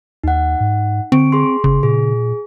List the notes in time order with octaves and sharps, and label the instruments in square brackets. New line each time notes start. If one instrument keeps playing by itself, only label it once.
[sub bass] D#2 [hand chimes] D#4 F#5
[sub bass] G#2
[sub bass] D3 [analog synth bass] C4 [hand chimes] C#6 D7
[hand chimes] G#4 C6
[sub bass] G1 [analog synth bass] C#3
[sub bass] A#2 [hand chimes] G#4